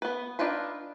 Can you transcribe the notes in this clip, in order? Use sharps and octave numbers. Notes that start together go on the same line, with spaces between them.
B3 B4
D4 D#4 F4 B4 B5